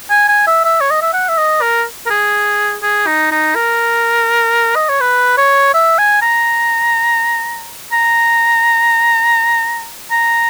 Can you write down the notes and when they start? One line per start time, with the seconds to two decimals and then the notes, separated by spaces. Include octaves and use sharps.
0.10 G#5
0.28 G#5
0.47 E5
0.64 E5
0.81 C#5
0.91 D#5
1.02 E5
1.13 F#5
1.29 E5
1.38 D#5
1.61 A#4
2.06 A#4
2.10 G#4
2.82 G#4
3.07 D#4
3.32 D#4
3.55 A#4
4.75 D#5
4.89 C#5
5.01 B4
5.37 C#5
5.74 E5
5.98 G#5
6.22 A#5
7.93 A#5
10.11 A#5